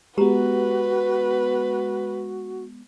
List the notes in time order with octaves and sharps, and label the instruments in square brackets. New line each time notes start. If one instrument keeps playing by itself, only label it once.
[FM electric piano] G#3 B3 [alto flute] F#4 [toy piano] G4 A#5 [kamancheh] B4